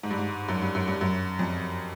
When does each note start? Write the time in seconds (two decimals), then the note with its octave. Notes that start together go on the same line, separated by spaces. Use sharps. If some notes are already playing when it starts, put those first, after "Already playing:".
0.03 G#2
0.10 G2
0.18 G#2
0.48 F#2
0.61 G2
0.75 F#2
0.88 G2
1.01 F#2
1.39 F2